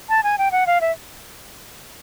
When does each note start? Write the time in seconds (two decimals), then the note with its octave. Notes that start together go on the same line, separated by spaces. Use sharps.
0.09 A5
0.23 G#5
0.38 G5
0.52 F#5
0.67 F5
0.81 E5